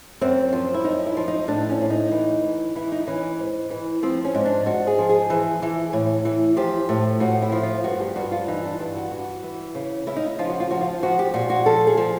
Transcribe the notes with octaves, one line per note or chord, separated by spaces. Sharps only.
F#2 C4
F3
E4
F#2 D#4
E4
F3
D#4
A2 D4
C#4
A2
D#4
E3
E3
E3 E4
D#4
E3 C#4
G#2
E3
F3 C4
C#4
G#2
D4
G#2 F#4
G#4
F3
G#4
E3
E3
A2
E3
F3 G4
A2
A2 F#4
E4
F3
F4
G2 F#4
G4
G2 F#4
F4
E3 D#4
D4
G2 F4
F#4
E3 F#4
E3
C#3
C#3 E4
D#4
E4
F3 F4
F#4
F4
F3 F#4
F4
F3 F#4
G4
A#2 F#4
F#4
F3 A4
G#4
F3